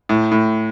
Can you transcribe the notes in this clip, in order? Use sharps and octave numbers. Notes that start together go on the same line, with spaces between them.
A2
A2